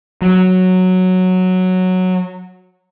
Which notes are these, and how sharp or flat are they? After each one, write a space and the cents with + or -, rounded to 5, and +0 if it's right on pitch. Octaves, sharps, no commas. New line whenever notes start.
F#3 -5